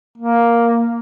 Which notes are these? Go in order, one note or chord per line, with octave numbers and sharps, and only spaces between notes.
A#3